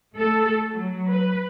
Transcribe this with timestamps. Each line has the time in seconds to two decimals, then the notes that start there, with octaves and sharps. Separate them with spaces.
0.15 A3 A4
0.72 F#3
1.10 B4